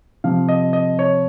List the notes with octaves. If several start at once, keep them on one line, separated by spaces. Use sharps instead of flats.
C3 F3 F5
D#5
D#5
C#5